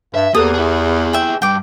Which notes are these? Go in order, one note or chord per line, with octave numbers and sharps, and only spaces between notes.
G2 E5
E2 A#3 G4 A4 B4 D#6
E4 G#4
E5 G5
G2 G5 D6